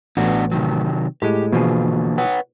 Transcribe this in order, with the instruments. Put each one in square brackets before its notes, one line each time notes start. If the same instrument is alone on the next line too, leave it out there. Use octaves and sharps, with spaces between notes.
[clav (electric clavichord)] A1 [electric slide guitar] B3 D4 F#4
[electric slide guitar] C3 D#3 F#3
[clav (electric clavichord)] A2 G#3 [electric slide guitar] G4
[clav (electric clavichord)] B2 F3 G#4 [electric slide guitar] D3 E3 A#3
[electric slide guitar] B4 C#5 F#5